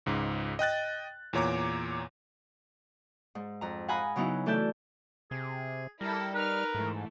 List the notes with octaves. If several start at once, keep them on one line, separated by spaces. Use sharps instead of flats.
C#2 G#2
D#5 G5 F#6 A6
E2 A#2 C#5 A#5 D6
G#2
F2 A#5
F5 F#5 G#5 A#5 B5 D#6
C#3 F#3 B3 D#4 E4
E3 A3 A4 D5 A5 G6
C3 G#4
G3 E4 A4 A#4
D#4 A#4 B4 F6
G#2 E3 A3